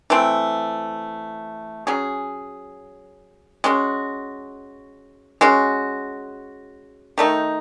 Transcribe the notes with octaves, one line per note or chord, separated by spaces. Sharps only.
E3 A3 C4
F#3 C#4 G#4
G#3 C#4 F#4
G#3 C#4 F#4
D#3 A3 D#4